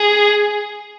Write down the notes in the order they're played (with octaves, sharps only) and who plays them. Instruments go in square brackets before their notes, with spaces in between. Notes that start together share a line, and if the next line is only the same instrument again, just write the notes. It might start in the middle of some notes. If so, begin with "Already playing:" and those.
Already playing: [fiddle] G#4